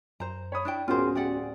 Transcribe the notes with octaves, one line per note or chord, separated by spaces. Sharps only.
F#2 C5 A#5
C#5 B5 D#6
D4 E4 G5
D1 B3 C#4 F4 F#4 G#4 A#4 C5
G4 D5 F#5